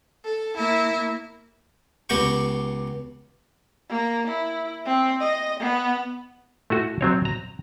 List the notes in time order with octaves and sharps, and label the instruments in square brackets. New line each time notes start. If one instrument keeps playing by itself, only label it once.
[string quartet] A4
A#3 E4
[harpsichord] C#2 B3 F#4 G4 G5 C#6
[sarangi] A#3
E4
C4
D#5
B3
[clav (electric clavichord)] A3 E4 F#4
F#3 C4 C#5
A#5